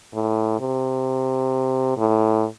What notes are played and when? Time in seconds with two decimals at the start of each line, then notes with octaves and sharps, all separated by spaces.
0.14 A2
0.60 C3
1.97 A2